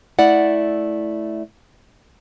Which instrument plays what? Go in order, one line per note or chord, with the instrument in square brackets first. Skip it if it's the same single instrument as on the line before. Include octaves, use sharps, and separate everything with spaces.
[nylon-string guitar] A3 E4 D5 F#5